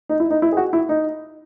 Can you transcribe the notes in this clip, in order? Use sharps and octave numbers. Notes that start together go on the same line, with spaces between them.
D#4
E4
D#4
E4
G#4
F#4
E4
D#4